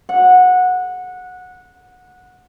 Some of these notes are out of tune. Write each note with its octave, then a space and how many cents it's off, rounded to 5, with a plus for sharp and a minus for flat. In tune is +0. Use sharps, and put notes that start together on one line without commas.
F#5 -15